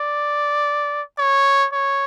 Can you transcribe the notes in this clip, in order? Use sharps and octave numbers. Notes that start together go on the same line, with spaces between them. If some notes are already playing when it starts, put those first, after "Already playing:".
Already playing: D5
C#5
C#5